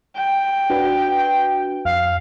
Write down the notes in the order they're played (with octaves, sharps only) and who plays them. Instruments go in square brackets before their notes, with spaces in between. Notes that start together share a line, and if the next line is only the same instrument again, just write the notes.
[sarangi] G5
[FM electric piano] D4 F#4 B4
[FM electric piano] F2 [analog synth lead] F5